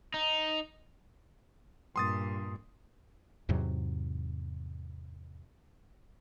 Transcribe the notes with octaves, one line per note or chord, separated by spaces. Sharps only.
D#4
G2 A#2 C6 D#6 A6
E2 G#2 C3 F#3